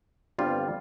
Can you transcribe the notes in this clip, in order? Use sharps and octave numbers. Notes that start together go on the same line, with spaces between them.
G1 G2 G3 C4 F4